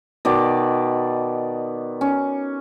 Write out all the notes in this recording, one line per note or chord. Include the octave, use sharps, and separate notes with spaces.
B2 D#3 D5
C#4